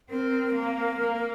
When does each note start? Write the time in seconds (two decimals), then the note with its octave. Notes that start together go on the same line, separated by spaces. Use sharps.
0.10 C4 A#4
0.55 A#3
1.01 A#3